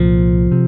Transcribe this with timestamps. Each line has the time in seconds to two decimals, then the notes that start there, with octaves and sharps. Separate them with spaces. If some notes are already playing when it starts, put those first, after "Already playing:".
Already playing: C2 A#2 F3
0.52 C3